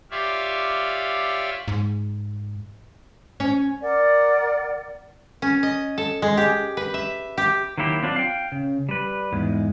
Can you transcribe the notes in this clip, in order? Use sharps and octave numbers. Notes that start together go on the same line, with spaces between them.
F4 G4 C#5 D5 E5 F5
G#2
C#4
A#4 D5 F#5
C#4
D#5
A4
G#3
G4
B4
E5
G4
D#3 F#3 A#3 E4 G4
F#3 C4 D4 F4
F5 G5
C#3
G3 B4
E2 G#2 G#3